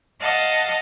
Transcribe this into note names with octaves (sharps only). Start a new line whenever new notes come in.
D#5 F5 F#5 A5